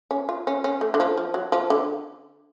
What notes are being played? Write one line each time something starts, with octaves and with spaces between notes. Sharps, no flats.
C#4
F4
C#4
C#4
A3
D3
F3
F3
F#3
F3
D3